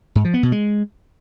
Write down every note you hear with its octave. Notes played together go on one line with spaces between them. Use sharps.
G#2
F3
B3
B2
G#3